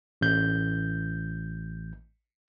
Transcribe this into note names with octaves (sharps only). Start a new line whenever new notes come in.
A1 G6